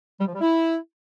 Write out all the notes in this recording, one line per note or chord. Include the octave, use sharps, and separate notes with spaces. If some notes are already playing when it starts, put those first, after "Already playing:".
G3
F3
G3
E4